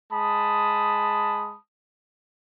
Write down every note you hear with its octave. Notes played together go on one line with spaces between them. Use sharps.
G#3 A5 B5 D#6